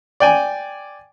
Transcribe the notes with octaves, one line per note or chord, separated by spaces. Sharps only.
D5 G5 G#5